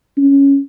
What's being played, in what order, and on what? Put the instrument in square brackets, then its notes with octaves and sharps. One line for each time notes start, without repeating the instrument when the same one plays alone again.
[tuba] C#4